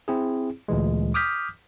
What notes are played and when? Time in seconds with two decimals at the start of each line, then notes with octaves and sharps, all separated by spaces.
0.08 C4 E4 G#4
0.68 D2 A#2 E3 G#3
1.14 D6 D#6 F6 G6 B6